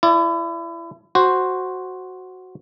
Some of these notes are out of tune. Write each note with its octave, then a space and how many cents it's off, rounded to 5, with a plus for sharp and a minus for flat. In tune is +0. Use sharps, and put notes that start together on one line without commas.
E4 +30 D5 +0
F#4 +0 C5 +0